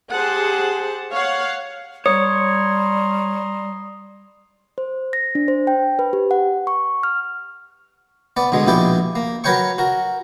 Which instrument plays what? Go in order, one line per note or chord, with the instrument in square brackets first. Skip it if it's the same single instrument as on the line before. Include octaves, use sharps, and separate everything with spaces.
[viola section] G4 G#4 C5 F#5 A5
C#5 F5 F#5
[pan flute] G3 [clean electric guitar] C#5 [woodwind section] A#5 C6 [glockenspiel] D#6
[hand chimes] C5
A#6
D4
C5
G5
B4
G4
F#5
C#6
F6
[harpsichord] B3 D5
B2 D3 G#3
A#1 B2 E4 G4 D5
A#3
F#3 A#4 B4 C#5 G5 C#6
F#4 A#4